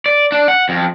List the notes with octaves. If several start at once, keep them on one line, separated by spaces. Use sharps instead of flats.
D5
D4
F#5
F2